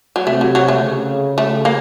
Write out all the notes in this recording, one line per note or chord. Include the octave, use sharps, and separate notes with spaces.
F#3
C3 A3
F#3
F#3
A3
C#3
A3
A#3